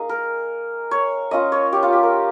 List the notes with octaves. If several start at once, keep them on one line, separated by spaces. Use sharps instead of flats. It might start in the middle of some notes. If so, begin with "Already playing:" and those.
Already playing: A#3 D#4 G#4
A#4
C#5
A#3 C#4 F4 D#5
C#5
G4
F4
G4
A#4